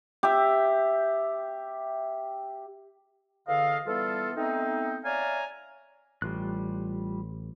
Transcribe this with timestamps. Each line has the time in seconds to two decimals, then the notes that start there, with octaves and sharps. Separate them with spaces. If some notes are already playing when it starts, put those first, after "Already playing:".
0.23 G4 E5
3.47 E2 D3 A4 D#5 F5
3.86 E3 G3 B3 F4 A4
4.36 A3 B3 C4 D#4
5.04 C#5 D5 E5 F5 G#5 A#5
6.22 A1 G3 F4 F#6